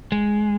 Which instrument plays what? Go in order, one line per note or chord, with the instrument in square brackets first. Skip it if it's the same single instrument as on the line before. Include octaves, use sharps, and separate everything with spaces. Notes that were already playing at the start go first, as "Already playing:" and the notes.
[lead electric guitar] G#3